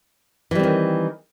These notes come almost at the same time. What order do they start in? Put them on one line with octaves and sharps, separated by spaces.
E3 G3 C4 D#3